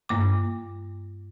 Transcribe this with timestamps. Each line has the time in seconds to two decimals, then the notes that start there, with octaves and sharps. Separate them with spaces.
0.09 G2 A#3 D6